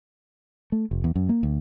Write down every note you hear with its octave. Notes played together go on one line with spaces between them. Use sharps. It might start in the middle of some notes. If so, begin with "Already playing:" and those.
A3
F1
E2
F#2
A#3
D2